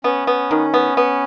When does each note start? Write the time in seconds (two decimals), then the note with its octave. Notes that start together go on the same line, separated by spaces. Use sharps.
0.04 B3 C#4
0.27 B3
0.51 D#3
0.74 B3
0.97 B3